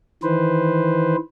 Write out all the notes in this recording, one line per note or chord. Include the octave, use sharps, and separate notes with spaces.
D#3 E3 B4 C5